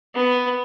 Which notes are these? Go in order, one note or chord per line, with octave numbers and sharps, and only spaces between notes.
B3